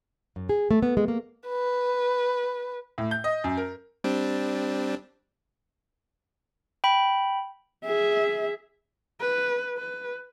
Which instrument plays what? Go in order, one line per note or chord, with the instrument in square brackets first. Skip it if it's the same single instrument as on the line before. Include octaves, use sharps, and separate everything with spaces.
[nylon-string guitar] F#2
G#4
A3
B3
G#3
A#3
[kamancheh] B4
[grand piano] A2
G6
D#5
F#2
A#4
[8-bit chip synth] G3 C4 D4
[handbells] G5 B5
[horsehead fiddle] G#4 E5
B4
B4